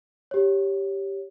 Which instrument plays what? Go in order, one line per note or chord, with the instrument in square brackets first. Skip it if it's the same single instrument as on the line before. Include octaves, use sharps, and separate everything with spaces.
[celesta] G4 C#5